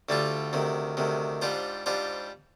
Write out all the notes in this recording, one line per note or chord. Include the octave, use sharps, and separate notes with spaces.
D2 D3 G3 D4 F4
D2 C3 D#3
D2 C3 D#3
G#2 G3 D4 F4 C5
G#2 G3 D4 F4 C5